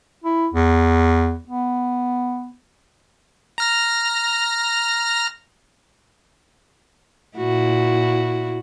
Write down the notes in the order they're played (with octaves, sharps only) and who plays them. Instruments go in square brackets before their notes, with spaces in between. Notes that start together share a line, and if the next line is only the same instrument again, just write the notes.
[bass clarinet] E4
E2
B3
[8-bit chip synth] A#5 F6 A#6
[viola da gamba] A#2 E4 F#4